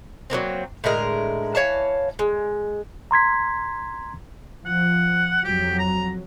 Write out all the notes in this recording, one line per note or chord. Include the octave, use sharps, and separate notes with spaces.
F#3 G#3 A#3 C4
A2 D3 G#3 A#4
E3 C#5 F5 A5
G#3
A#5 C6 G#6 B6
F3 F#5
F2 F#3 G4
A#5